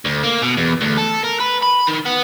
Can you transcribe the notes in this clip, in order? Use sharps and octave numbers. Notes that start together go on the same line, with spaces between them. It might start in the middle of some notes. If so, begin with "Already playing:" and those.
D2
A#3
B2
E2
D2
A4
A#4
B4
B5
D#3
B3